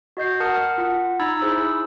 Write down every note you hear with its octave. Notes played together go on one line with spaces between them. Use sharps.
F#4 D#5 G6 C7
A#4 F#5 A5 D#6 F6 C#7
F4 F#5
D#4 A#5 B5 E6 G#6 A6
D#4 E4 G#4 C5 E6